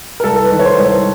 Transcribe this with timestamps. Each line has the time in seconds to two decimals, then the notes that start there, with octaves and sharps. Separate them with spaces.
0.20 A#4
0.24 C2 A4
0.44 B4
0.51 D#3
0.59 C#5
0.64 C5
0.78 C2